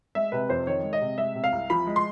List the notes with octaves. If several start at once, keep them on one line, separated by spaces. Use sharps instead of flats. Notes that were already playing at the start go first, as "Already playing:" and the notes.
G#3 E5
C3 B4
F2 C5
D#3 C#5
G#3
D#5
C3
G#3 E5
C3
F5
C2
F3 B5
G#3
C6